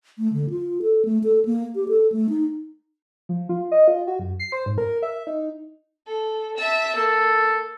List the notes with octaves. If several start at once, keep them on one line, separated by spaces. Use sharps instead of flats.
A3
D3
F4
A4
A3
A4
A#3
G4
A4
A3
D#4
F3
F4
D#5
F4
F#4
F#2
C7
C5
G#2
A#4
E5
D#4
A4
E5 A5
A#3 A4